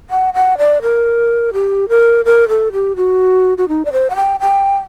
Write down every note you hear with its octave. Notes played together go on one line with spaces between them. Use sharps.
F#5
F#5
D5
A#4
G4
A#4
A#4
A4
G4
F#4
F#4
D#4
D5
C5
F#5
G5
G5